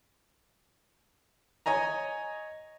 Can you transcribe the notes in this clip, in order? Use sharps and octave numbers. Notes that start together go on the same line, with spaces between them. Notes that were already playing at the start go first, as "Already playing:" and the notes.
C#5 D#5 G#5 A#5